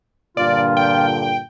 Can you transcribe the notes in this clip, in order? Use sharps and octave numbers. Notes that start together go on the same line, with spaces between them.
G2 A#2 D3 F4 D5
G5